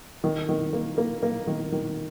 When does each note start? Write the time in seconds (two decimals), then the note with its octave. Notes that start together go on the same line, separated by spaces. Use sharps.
0.24 D#3
0.49 D#3
0.73 A#3
0.98 A#3
1.23 A#3
1.47 D#3
1.72 D#3